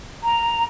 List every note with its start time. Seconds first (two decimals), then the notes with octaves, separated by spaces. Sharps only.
0.24 A#5